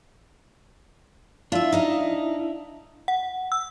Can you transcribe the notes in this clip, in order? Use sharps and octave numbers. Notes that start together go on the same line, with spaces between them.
D4 E4 F4 E5
D#4 D#5 F5
F#5
E6